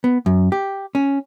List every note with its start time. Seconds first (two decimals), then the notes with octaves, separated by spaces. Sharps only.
0.04 B3
0.26 F#2
0.52 G4
0.95 C#4